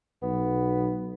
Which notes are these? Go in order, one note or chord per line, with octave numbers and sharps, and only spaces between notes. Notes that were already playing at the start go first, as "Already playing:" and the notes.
B1 B3